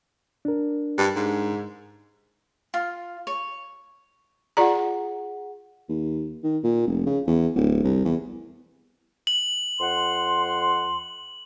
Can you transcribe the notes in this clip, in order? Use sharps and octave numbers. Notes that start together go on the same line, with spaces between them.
D4 A#4
G2
G#2
F4
C#5
F4 G#4 D5 F#5 A#5
D#2
D#3
A#2
F1
C#3
E2
D1
C2
E2
F#7
F2 F#5 C6